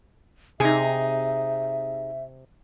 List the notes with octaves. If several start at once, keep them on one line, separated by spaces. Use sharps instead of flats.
C3 D#4 G#4 E5